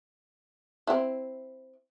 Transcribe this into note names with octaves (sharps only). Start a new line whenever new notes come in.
C4 E4